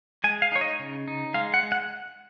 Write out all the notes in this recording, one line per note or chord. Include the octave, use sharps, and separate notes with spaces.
G#3 G#5
F5
D#4 C#5
D#5
C#3
D#4
G#3 F5
F#5
G#3
F#5